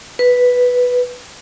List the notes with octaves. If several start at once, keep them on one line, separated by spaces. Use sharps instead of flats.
B4